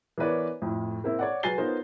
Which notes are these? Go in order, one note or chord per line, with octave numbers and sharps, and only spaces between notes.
E3 B3 A#4 B4 C#5 D5
F2 A2
A#3 C4 E4 E5
C#5 D5 F#5
F#3 B4 G#5 A6 C7 G7
B3 D#4 F4 A#4 C5 C#5